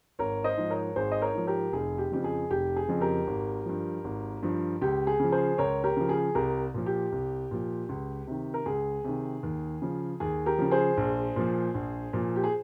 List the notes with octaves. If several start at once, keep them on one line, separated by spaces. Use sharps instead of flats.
G#1 A#4 C#5
C5 D#5
G#2 F3
A#4 C#5
G#1 G#4 C5
D#5
A#4 C#5
G#2 F3
G4 A#4
F1 G#4
G4
F2 C#3 F3 G4
G#4
F1 G4
G#4
F2 C#3 F3
G4 A#4
G#1
G2 F3
G#1
G2 F3
C#2 G4
G#4
C#3 F3
G#4 C5
C#2 A#4 C#5
G4 A#4
C#3 F3
G#4
C2 G4 A#4
A#2 F3
G4
C2
A#2 F3
C#2
C3 D#3
A#4
C#2 G#4
C3 D#3
D#2
C#3 F3
D#2 G#4
G4 A#4
C#3 F3
G#4 C5
A#1
A#2 F3
A#1
A#2 F3
G4
G#4